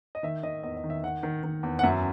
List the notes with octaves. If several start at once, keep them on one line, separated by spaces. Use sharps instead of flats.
D#5
D#3 E5
D#3 D#5
E2 D#5
D#5
D#3
E5
D#3 F#5
D#3
D#3
E2
F#5
F#2 E5